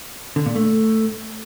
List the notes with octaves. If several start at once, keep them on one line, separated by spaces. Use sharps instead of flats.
D3
A#2
A3